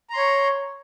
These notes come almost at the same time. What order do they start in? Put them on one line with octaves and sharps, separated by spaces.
A#5 C6 C#5